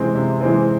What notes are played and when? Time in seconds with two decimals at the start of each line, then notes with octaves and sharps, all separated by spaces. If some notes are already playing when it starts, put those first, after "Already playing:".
Already playing: C3 E3 G#3 C4
0.15 C3
0.41 E3 G#3 C4